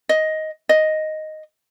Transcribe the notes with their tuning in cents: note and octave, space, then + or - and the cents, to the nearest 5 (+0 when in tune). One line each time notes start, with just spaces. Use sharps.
D#5 +10
D#5 +0